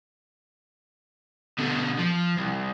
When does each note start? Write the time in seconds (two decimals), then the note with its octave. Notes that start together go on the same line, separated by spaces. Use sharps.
1.59 B2 D3
1.99 F3
2.38 C2